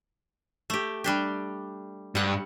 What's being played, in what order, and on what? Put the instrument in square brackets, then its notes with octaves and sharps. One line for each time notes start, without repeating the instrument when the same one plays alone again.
[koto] A3 G4
G3 D4 G4
[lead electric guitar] G2 [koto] G3 F#5